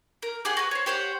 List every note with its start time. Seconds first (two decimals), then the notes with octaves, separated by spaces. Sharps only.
0.22 A#4
0.45 G4 G#4 F#5
0.57 F#4 B4
0.71 C5 C#5
0.86 G4 C5 C#5 F#5